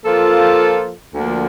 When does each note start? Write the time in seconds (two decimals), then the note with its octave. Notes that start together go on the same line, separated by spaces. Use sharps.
0.05 F3 A#3 F4 A4
1.14 D2 D3 F3 A#3 D4